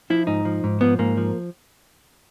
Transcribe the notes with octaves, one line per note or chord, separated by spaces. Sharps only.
F3 E4
G#2 D#4
F3
G#2
F3 B3
G#2 A#3
F3